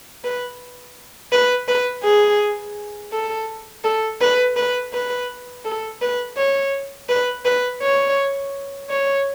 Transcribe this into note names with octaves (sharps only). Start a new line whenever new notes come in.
B4
B4
B4
G#4
A4
A4
B4
B4
B4
A4
B4
C#5
B4
B4
C#5
C#5